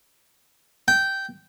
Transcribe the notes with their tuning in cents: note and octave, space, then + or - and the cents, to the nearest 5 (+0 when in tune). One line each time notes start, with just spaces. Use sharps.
G5 -10